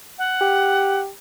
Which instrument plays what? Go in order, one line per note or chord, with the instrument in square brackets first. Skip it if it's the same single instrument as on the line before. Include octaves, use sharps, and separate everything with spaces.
[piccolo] F#5
[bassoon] G4